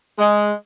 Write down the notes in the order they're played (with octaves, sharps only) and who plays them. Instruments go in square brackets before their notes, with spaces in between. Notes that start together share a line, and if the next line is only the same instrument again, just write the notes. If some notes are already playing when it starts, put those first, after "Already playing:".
[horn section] G#3